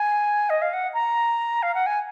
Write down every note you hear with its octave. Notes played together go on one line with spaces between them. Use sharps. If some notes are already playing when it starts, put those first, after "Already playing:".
Already playing: G#5
D#5
F5
F#5
A#5
F5
F#5
G#5